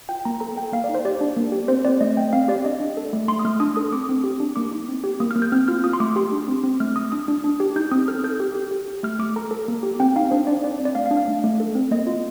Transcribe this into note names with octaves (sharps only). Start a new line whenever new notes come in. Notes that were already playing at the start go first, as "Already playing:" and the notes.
F4 G5
A#3 A#5
A4 A#5
A4 G5
A#3 F5
D5
D#4
C5
G4 D5
D4
A#3
G4
C4 C5
C4 D5
A3 D#5
A3 G5
C4 F5
G4 D5
D4 D#5
D4
A4
A3
A3 C6
D#6
A3 F6
D4 D#6
A4 D#6
C4 D6
C4
G4
D4
A#3 D6
D#4
C4
G4
A#3 D#6
F6
A#3
G6
C4 F6
F4 F6
F4 D#6
C6
A3 D6
G4 C6
D4
C4
C4
A3 F6
A3 D#6
D4 D#6
D4
D4
G4
D#4 G6
C4 D#6
A4 F6
A4 G6
G4
G4
G4
G4
A3 F6
A3 D6
A4 A#5
A4
A#3
G4
C4 G5
D#4 F5
D4 C5
D4 D5
C4 D5
C4
D5
A3 F5
F5
D4
F5
A3
A3
A4
C4
A#3 D#5
F4